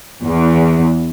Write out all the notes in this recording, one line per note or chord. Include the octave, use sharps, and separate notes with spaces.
E2